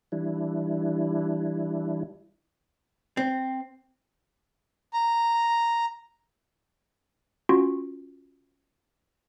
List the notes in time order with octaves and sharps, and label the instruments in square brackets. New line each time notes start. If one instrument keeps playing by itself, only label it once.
[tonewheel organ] E3 G3 D4 E4
[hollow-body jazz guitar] C4
[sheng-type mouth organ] A#5
[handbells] C#4 F4 F#4